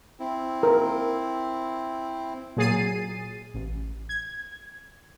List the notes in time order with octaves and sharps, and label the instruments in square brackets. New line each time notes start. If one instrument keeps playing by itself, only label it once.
[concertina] C4 E4
[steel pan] A#4
[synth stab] A#2 F#3 G#4 A6 C7 D#7
A1
G#6